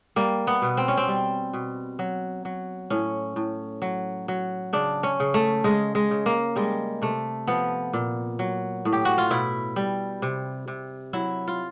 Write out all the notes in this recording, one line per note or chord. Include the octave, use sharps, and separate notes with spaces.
G3 A#3
B3
B2
C4
C#4
C4
G3
B2
F#3
F#3
A2 C#4
A2
F#3
F#3
C#3 D4
C#4
C#3
A3
C#3 G#3
G#3
C#3
A#3
G3 G#3
C3 A3
F3 B3
A#2
F#3
A2
G4
F#4
F4
B2 E4
G3
C3
C3
F#3 E4
F4